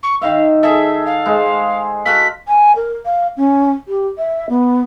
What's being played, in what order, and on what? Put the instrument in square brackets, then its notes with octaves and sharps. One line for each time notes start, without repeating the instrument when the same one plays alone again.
[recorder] C#6
[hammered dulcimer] D#3 E5 [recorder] F5
[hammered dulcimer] G#4 A4 [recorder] E5
[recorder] F5
[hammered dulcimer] G#3 C5
[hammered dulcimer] F#4 A4 F5 [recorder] B6
[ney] G#5
A#4
F5
C#4
G4
E5
B3